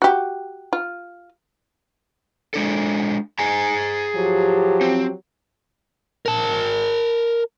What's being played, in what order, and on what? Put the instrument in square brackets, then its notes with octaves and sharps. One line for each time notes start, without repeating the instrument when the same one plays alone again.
[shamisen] F#4 G4
F4
[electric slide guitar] G#3 D4 A4
G#4 G#5 A#5
[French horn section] F3 F#3 G4
[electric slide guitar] C4
[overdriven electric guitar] A#4 A5